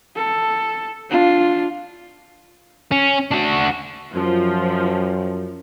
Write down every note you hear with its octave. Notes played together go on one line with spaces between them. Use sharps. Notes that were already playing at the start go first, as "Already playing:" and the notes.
A4
D4 F4
C#4
D4 F#4
F#2 F3